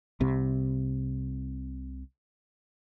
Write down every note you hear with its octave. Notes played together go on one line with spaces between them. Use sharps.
C2 C3